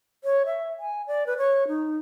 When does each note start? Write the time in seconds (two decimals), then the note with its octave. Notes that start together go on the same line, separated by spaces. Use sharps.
0.24 C#5
0.46 E5
0.79 G#5
1.07 D5
1.26 B4
1.38 C#5
1.68 D#4